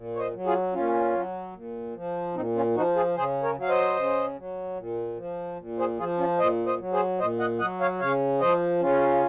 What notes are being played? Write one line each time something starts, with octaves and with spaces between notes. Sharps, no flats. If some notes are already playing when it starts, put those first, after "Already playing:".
Already playing: A#2
C#5
C5 D#5
F#3
F4 G#4
A#2 C#4 F4
F#3
A#2
F3
A#2 C4 D#4
C#4 F4
F3 D#4 F#4
F4 G#4
C#3 G#4 C5
A#4 C#5
F#3
F5
C5 D#5
C#3
F#3
A#2
F3
A#2
G#4 C5
F3 F4 G#4
C#4 F4
A#2 C5 D#5
C5 D#5
F#3
G#4 C5
A#2 C5 D#5
D#5 F#5
F#3 D#5 F#5
C#5 F5
C#3 C#5 F5
F3 C5 D#5
C#3 C#4 F4